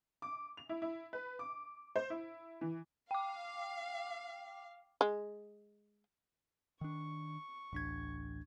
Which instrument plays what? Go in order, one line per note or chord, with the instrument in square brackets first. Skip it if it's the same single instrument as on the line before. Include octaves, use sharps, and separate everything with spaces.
[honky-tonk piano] D6
F7
E4
E4
B4
D6
C5
E4
E3
[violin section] F5 [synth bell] G5 D6
[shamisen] G#3
[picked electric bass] D#3 D4 [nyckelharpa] C#6
[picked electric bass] A1 [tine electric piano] D2 D4 G#6